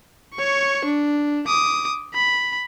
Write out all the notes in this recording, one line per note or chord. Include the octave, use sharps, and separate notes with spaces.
C#5 C#6
D4
D6 D#6
B5